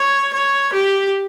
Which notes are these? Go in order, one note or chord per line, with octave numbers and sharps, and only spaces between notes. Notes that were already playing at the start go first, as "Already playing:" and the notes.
Already playing: C#5
C#5
G4